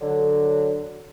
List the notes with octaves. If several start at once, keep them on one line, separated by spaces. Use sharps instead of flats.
D3 F#3